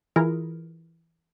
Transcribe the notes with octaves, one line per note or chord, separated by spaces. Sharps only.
E3 E4 F4 G#4 A#4